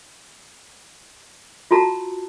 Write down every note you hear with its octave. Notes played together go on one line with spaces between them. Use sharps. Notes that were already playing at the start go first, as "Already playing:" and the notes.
F4 F#4 A5 A#5